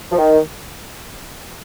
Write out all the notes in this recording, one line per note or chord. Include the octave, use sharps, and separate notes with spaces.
F3
D#3